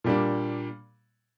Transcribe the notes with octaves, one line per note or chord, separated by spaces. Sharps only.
A#2 G3 A#3 D4